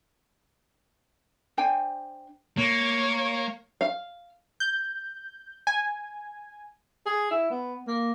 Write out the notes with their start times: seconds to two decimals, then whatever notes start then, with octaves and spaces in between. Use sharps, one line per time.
1.57 D4 C5 G5 G#5
2.57 A#3 C#5
3.81 F5
4.60 G6
5.67 G#5
7.06 G#4
7.31 E4
7.50 B3
7.88 A#3